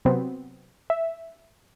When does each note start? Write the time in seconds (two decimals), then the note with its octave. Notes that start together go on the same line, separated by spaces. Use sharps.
0.05 C3 F#3 B3 C4
0.90 E5